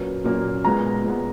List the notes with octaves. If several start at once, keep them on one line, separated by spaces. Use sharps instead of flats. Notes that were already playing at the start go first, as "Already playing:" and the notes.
Already playing: A#2 F#3 A#3 C#4 B4
A#2 F#3 A#3 C#4
A#2 G#3 B3 A#5
A#2 G#3 B3